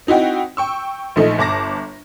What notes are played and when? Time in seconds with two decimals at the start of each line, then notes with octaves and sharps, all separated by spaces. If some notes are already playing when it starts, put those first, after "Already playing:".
0.07 C4 D#4 E4 F#4 G5
0.57 G5 C#6 E6
1.16 A#1 F3 A3 D#4
1.38 G1 A5 D6 A#6